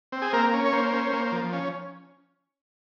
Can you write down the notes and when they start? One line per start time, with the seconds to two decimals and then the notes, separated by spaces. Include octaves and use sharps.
0.12 C4
0.22 G#4
0.33 A#3 A#4
0.53 C#4
0.66 C#5
0.73 A#3 C5
0.93 C#4
1.13 A#3
1.32 F3
1.53 C#4